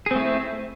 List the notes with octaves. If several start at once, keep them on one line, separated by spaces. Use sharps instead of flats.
A3 C4 E4 G#4